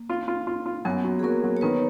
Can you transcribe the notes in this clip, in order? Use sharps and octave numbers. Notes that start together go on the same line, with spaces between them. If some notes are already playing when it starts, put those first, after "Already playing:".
Already playing: A#3
F4
F4
F4
F4
F#2 B3
F#3
G#4
F#3 A#3 A#4
F#3
C#5
D#3 B3 B4